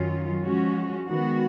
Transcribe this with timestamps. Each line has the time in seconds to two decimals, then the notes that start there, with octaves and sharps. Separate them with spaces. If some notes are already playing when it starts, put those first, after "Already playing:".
Already playing: F#2 D#3 F#3 C#4 F4
0.43 F3 G#3 C#4 F#4
1.07 D#3 G#3 B3 F#4